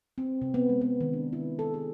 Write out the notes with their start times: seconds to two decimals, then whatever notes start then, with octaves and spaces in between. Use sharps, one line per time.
0.18 C4
0.42 C3
0.54 B3
0.69 G#3
0.81 B3
1.01 D#3
1.13 D4
1.33 E4
1.59 A4
1.74 G#4